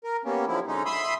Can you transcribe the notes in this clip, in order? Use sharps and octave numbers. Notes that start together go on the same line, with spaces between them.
A#4
G3 A#3 B3 C#4
D3 F3 F#3 E4
D3 G#3 C#4 D#4
E5 B5 C6 D#6 E6